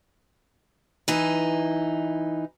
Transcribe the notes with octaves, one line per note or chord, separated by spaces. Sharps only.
E3 D#4